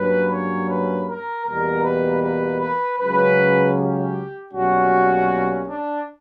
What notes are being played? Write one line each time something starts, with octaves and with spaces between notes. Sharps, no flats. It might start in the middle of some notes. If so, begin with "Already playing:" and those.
Already playing: G2 F#3 A#3 C#4 B4
C#5
B4
A#4
E2 B2 G3 A#3 A#4
B4
B4
B4
C#2 C#3 F#3 C#4 B4
G4
B1 A#2 G3 C#4 F#4
D4